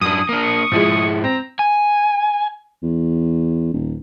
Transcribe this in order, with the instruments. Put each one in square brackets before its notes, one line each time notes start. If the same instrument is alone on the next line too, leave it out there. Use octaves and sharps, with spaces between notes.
[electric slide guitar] F#2 D4 [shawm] E4 [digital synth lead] D#6
[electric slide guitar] A#3 D4 [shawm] A#4
[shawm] C#6
[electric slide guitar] G#2 E4 [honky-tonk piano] F3 G#3
[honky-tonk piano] C4 [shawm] A#5
[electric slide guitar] G#5
[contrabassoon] E2
D#1